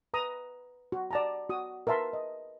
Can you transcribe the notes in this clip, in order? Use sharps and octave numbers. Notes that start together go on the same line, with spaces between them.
B4 A#5 D#6
F#4
D5 A5 A#5
F#4 D#6
A#4 B4 E5 A5 C6
D#5